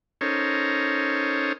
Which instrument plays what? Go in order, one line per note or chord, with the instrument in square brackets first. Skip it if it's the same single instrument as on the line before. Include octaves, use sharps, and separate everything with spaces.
[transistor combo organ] C#4 D#4 A4 A#4 C5 C#5